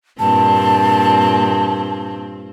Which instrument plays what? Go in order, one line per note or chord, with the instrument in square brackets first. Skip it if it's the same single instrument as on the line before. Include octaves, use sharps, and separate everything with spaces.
[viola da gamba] G2 A#2 C4 [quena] A5